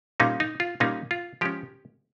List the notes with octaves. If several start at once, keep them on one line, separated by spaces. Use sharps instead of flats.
A#2 G3 A#3 C#4 D#4
D#4
F4
A#2 G3 A#3 C#4 D#4
F4
F3 G#3 C#4 G4